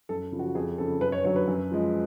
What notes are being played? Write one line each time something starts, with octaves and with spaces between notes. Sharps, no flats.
F#2 A4
C#3 F3
F#4
F2 G#4
C#3 F3 A4
F#2 B4
C#5
D3 F#3 C#5
B4
F#2
F3 G#3